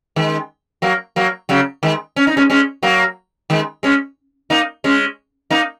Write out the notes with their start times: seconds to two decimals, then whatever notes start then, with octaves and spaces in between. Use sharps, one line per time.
0.16 D#3 G#3
0.82 F#3 A#3
1.16 F#3 A#3
1.49 C#3 F#3
1.83 D#3 G#3
2.16 C#4
2.27 D#4
2.37 G#3 C#4
2.50 G#3 C#4
2.83 F#3 A#3
3.50 D#3 G#3
3.83 G#3 C#4
4.50 A#3 D#4
4.84 G#3 C#4
5.50 A#3 D#4